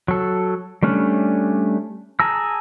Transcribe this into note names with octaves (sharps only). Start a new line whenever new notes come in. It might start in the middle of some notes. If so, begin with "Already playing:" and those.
F#3 A4
G3 A3 C#4 D4
G#4 A5 A#5 E6